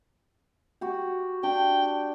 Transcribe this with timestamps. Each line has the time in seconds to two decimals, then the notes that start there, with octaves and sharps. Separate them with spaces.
0.81 F#4 G4
1.43 D4 G5